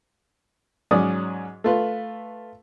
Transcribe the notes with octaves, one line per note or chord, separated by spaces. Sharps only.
G#2 F#3 C#4 D5 D#6
A3 F4 B4